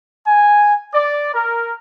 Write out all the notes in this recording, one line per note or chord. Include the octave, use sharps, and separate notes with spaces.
G#5
D5
A#4